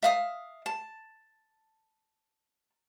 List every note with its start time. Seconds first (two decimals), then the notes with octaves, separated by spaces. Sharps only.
0.03 E5 F5 D#6
0.66 A5